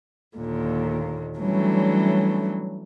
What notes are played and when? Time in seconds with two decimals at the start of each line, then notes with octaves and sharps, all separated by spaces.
0.36 D#2 A#2 D3
1.40 E3 F#3 G3 A3 C#4 D4